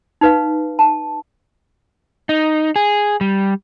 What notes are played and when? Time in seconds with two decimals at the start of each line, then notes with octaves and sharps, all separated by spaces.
0.21 D#4 B4 F5
0.79 A5
2.29 D#4
2.76 G#4
3.21 G3